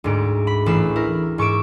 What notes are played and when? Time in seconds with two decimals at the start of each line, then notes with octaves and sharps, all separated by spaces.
0.04 D2 G#2 D7
0.47 B5
0.66 A1 E6 C7
0.96 E4 A#4
1.38 G#2 C#6 D6 E6 D7